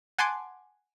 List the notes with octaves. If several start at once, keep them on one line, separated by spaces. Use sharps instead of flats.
F#5 G#5 A5 C6 D6